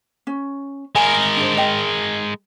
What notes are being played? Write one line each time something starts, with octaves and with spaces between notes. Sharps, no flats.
C#4
G#3 A#4 G#5 B5
D4 C5
D#5 G5